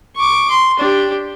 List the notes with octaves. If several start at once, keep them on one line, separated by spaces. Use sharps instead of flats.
C#6 D6
C6
D4 G4